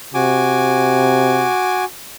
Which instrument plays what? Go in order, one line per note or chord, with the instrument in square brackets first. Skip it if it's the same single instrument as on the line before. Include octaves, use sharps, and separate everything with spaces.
[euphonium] C3 [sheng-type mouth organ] F#4 G#5 D6